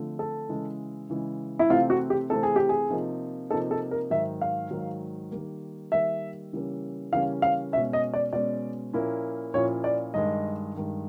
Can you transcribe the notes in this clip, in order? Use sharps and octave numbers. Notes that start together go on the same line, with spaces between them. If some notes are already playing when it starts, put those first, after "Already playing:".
Already playing: D3 F3 A3 C4
A4
C#3 E3 G#3
C#3 E3 G#3
E4
C3 E3 A3 C4 F4
F#4
G4
C3 E3 A3 C4 A4
G#4
G4
G#4
C3 F3 A#3 D#4
C3 F3 A#3 D#4 A4
A4
A#4
G#2 D#3 F#3 E5
F5
G#2 D#3 F#3
D#3 G3 A#3
D#3 G3 A#3 E5
C#3 E3 G3 A#3 C#4
C#3 E3 G3 A#3 C#4 F5
F5
B2 G#3 C#4 E5
D#5
D5
B2 G#3 C#4 D5
A#2 F3 A#3 C#4 E4
A#2 F3 A#3 C#4 E4 C#5
D5
G2 D#3 G#3 D#5
G2 D#3 G#3